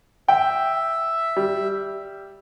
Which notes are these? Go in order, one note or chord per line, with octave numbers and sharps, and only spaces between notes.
E5 G5
G3